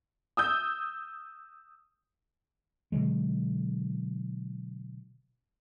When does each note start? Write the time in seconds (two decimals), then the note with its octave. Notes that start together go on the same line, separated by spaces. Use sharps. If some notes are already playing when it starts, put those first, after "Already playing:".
0.37 D#6 E6 G6
2.92 B2 D3 F#3 G#3